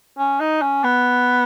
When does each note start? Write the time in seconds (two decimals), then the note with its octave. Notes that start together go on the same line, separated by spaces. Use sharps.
0.18 C#4
0.40 D#4
0.62 C#4
0.84 B3